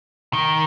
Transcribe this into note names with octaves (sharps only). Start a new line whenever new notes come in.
D#3